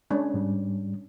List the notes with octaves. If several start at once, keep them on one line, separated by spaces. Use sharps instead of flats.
G#3 C#4 D4
G#2 G3